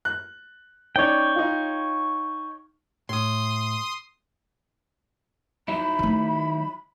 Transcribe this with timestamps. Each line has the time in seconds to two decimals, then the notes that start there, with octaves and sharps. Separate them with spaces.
0.05 F#6
0.96 C#4 D#4 C#5 D5 G5
1.36 D#4 F4
3.09 A2 C6 D#6
5.68 F#3 D#4 E4 B5
5.99 D#3 A3